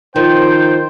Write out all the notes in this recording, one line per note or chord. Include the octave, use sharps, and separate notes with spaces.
D#3 F3 C5 G5